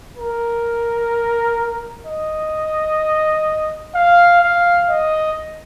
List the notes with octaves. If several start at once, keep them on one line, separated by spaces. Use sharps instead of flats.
A#4
D#5
F5
F5
D#5